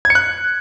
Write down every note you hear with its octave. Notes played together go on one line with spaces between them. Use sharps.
G#6
C#7
F#6